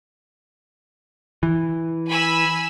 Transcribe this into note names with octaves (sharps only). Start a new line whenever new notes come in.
E3
G#5 B5 E6